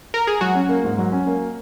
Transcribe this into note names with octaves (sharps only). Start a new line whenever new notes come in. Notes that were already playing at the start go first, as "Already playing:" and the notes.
A#4
G#4
F#3 F#4
C#4
A#3
G#2
F#3
C#4
A#3